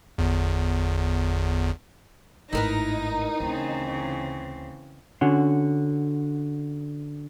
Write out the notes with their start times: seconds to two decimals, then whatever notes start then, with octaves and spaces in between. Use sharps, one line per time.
0.18 G1 E2
2.53 G#1 A2 D#4 E4 A#4 B4 A#6
3.40 D2 C#3 E3 C4
5.21 D3 C#4 D4 F#4 C#5 C6